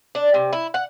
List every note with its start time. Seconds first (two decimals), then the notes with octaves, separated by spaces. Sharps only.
0.15 D4
0.34 C3
0.53 E4
0.74 F#5